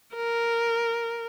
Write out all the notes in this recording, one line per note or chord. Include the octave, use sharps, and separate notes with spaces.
A#4